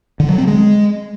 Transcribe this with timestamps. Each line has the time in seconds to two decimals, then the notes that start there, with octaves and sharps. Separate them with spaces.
0.20 D3
0.29 F#3
0.38 C4
0.47 G#3